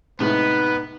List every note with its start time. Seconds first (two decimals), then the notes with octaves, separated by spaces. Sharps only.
0.20 A2 C3 G#3 B3 D#4 B4